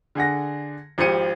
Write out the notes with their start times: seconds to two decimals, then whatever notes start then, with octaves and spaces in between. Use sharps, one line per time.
0.15 D3 G#4 F#5 A#6
0.98 G#1 F3 G4 C5 C#7 D#7